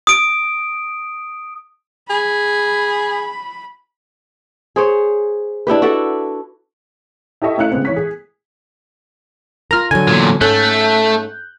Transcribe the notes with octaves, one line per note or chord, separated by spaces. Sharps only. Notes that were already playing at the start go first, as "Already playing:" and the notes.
D#6 D7
G#4 B5
G#4 C5 C#5
D4 E4 G4 B4
F#4 A4 D5 E5
E4 G4 A4 D#5 E5 C#6
A3 C#4 E4 F5 F#6 C#7
C#3 G#3 B3 C4
E3 C#5 B6
G#4
F4 A#4 A#5 F6
D3 F#3 G#5
E2 A#2
G#2 A3 C#4 A4 F#6 G6